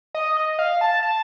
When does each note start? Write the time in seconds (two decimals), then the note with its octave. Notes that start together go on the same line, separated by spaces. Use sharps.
0.15 D#5
0.37 D#5
0.59 F5
0.81 A5
1.03 A5